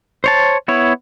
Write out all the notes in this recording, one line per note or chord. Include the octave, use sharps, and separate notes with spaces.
C5 C#5 A5
B3 E4 C#5